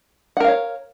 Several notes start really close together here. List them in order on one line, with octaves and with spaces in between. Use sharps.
F#5 A#4 F5 C#5